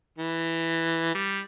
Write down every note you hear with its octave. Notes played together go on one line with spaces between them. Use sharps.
E3
G3